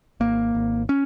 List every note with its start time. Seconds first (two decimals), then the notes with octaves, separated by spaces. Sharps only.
0.20 G#1 A#3
0.55 G#1
0.89 C#4